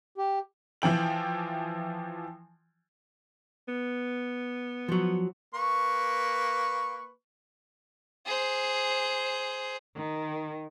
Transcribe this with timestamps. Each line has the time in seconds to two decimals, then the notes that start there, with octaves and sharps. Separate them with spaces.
0.18 G4
0.82 E3 F3 G5 F#7
3.68 B3
4.88 F3 F#3
5.54 A#3 B4 C#6
8.26 G#4 C5
9.97 D#3